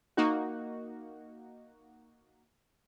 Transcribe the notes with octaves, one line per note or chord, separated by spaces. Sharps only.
A#3 D#4 F#4